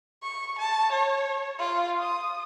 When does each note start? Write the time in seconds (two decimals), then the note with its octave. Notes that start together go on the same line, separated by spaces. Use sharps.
0.24 C#6
0.59 A5
0.92 C#5
1.59 F4
2.00 D#6